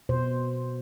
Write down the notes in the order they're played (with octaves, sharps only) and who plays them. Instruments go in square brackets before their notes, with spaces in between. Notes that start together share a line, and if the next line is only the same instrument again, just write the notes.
[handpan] B2 C5